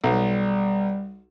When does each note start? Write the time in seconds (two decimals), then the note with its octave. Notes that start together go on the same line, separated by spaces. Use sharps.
0.04 B1 G3